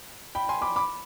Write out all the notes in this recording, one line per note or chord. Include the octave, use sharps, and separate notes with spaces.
G5 B5
G#5 C6
B5 D6
B5 D6